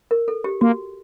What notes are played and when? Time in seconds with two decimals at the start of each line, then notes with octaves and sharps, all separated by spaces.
0.11 A#4
0.28 A4
0.44 G4
0.61 A#3 F#4